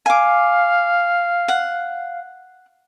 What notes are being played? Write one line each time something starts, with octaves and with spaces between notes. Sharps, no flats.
F5 G#5 D6
F#5